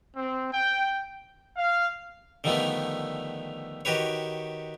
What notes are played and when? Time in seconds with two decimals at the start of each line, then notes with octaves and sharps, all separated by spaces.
0.16 C4
0.52 G5
1.56 F5
2.44 D3 D#3 F3 G3 A3 B3
3.85 D#3 F#4 G4 B4 C#5